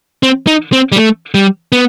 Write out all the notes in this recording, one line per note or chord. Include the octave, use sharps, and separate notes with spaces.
C4
D#4
C4
G3
A3
G3
B3